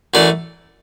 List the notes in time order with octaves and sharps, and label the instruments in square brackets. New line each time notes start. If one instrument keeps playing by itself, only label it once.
[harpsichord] F#2 E3 A3 D5